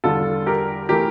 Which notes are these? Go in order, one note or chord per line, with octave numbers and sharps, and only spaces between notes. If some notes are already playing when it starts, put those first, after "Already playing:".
E2 D3 G3 F4 A4
G4 A#4
E3 A3 G4 A#4